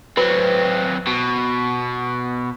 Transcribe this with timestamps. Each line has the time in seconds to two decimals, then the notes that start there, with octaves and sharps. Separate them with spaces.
0.17 F#3 C4 B4
1.07 B2